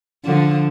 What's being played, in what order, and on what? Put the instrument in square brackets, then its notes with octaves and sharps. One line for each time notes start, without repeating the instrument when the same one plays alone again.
[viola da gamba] D3 F3